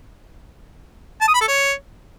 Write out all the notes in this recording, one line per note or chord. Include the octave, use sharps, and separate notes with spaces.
A5
D#6
B5
A4
C#5